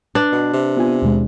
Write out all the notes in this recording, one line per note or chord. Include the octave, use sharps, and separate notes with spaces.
D4 B4
B2
C3
B3 F4 G#5
D#2 B2 G#3